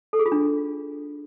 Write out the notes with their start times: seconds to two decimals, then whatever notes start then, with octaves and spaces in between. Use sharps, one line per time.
0.13 A4
0.19 G#4
0.26 F4
0.32 D4